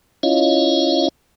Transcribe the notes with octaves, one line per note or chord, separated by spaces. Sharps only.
C#4 E4 F4 C#5 D#5 F5